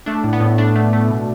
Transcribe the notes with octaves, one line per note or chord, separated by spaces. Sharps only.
A3 D4
A2
B3
A2
A3 D4
A3
A3
B2